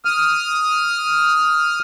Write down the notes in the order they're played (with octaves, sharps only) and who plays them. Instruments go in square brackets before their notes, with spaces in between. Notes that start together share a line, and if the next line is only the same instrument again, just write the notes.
[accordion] D#6 F6